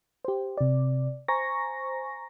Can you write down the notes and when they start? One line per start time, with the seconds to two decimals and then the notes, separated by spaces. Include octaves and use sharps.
0.25 G4 C5
0.57 C3 D5
1.28 C5 G#5 A#5 C#6 A#6